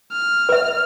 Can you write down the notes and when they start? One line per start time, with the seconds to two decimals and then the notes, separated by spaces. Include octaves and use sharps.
0.12 F6
0.49 B4 E5